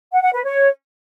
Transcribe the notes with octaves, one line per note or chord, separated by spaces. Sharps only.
F#5
F#5
B4
C#5